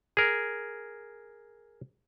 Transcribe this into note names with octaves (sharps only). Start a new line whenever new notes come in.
G#4 A#4